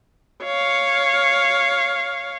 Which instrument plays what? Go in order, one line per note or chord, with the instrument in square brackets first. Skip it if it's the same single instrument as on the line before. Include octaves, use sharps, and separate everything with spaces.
[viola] C#5 F5